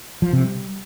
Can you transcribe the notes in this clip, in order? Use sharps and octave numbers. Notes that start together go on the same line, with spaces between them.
F3
C3
G3